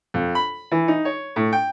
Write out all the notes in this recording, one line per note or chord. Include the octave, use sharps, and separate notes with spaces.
F2
B5
E3
D#4
C#5
A2
G5